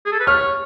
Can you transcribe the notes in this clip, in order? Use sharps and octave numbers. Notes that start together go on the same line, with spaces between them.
G#4
A4
B4
C#5 F6